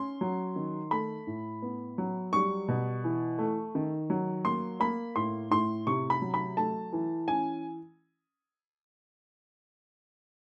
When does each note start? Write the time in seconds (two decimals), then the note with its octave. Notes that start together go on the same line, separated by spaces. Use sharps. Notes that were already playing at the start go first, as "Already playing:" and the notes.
Already playing: C#4 C6
0.21 F#3
0.56 D#3
0.91 A3 B5
1.27 A2
1.62 B3
1.98 F#3
2.33 G3 C#6
2.68 B2
3.04 E3
3.39 A3
3.75 D#3
4.10 F#3
4.45 A#3 C6
4.80 A#3 B5
5.16 A2 C6
5.51 A2 C6
5.87 C3 C#6
6.10 B5
6.22 F#3
6.34 B5
6.57 A3 A5
6.93 E3
7.28 C#4 G#5